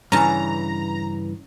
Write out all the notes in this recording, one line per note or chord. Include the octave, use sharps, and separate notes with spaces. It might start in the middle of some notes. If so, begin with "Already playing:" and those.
G2 C#3 E3 C#4 A5 A#5